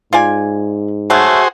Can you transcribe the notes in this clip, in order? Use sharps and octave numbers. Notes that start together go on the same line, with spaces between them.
G#2 F4 D5 G#5
F#3 A3 F#4 G#4 C5